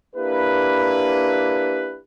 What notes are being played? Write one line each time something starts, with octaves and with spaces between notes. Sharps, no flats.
A#3 D4 E4 G4 B4